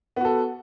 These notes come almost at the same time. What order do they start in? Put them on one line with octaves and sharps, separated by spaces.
B3 F#4 A4